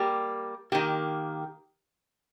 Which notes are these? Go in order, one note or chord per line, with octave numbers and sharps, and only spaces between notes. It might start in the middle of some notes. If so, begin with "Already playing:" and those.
Already playing: G3 A#3 G4
D#3 A#3 G4